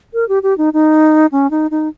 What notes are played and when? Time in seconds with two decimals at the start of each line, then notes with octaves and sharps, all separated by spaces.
0.14 A#4
0.29 G4
0.43 G4
0.58 D#4
0.73 D#4
1.32 C#4
1.51 D#4
1.71 D#4